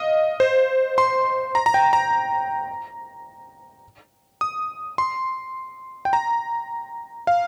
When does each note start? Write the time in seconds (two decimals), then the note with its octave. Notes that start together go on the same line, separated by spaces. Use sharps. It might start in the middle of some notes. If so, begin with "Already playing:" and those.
Already playing: D#5 F5
0.40 C5
0.98 C6
1.55 A#5
1.66 A#5
1.74 G5
1.93 A#5
4.41 D#6
4.98 C6
6.05 G5
6.13 A#5
7.27 F5